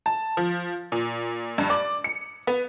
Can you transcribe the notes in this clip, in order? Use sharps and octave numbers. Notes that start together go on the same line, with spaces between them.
A5
F3
A#2
G2
D5
C#7
B3